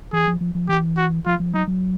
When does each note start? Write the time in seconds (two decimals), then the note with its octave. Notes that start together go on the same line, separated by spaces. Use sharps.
0.13 E3 G#4
0.27 F3
0.41 F3
0.55 F3
0.69 E3 G4
0.97 F#4
1.26 F3 F4
1.40 F3
1.54 F#3 D#4
1.68 F#3